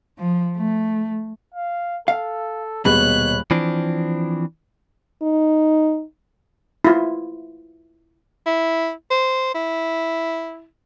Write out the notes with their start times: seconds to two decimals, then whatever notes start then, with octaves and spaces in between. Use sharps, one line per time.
0.19 F3
0.57 A3
1.54 F5
2.08 A4 F5
2.85 D#1 B2 G#3 C#5 B5 F#6
3.51 E3 F3 C4 D4
5.22 D#4
6.85 E4 F4
8.46 E4
9.11 C5
9.55 E4